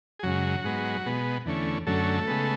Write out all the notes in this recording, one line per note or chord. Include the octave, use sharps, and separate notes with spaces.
G#4
F#2 C#3 F#3 G#3 F#4
G#2 G#3 B3
B2 G#3 B3
E2 D3 A3 C#4
F#2 D3 F#3 A3 C#4 A4
C#3 G#3 B3